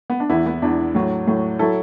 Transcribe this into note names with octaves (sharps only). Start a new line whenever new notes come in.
B3
D4
E2 E3 B3 E4
B3
E2 E3 D4
A2 F#3
A2 F#3
F#3 E4 A4